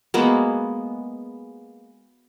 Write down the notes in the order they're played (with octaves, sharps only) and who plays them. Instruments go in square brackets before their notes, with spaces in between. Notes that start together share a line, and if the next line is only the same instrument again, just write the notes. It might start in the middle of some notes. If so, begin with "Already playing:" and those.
[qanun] G#3 A#3 B3 F#4